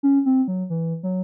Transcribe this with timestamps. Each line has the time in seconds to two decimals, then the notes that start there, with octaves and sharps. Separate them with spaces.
0.03 C#4
0.26 C4
0.48 F#3
0.70 E3
1.03 F#3